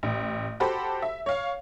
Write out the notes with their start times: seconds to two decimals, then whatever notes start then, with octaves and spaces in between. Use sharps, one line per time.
0.03 A1
0.60 F#4 G4 A4 C5 B5
1.02 E5
1.26 C#5 F5